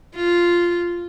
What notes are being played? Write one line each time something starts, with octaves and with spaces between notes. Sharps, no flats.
F4